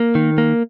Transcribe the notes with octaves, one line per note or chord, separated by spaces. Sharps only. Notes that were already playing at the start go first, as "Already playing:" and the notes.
Already playing: A#3
D#3
A#3